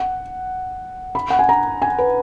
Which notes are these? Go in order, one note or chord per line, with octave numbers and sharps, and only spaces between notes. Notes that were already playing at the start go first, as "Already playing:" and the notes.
Already playing: F#5
B5
F#5
G#5
A#5
G#5
B4